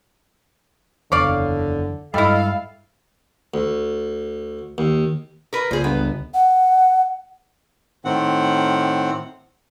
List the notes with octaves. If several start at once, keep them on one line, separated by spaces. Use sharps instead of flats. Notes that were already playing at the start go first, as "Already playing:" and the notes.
F#1 E2 D3 C#5 D5 F5
G2 G3 G#3 E4 A4 D#5 F5
D2
D#2
A#4 B4
C#2 A#2 G#4 C5
G1 B3
F#5
A2 D#3 C4 F#5